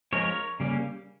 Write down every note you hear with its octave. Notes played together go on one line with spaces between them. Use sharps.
F3 G#3 C#4 A#4 C#5
C#3 G3 A#3 C#4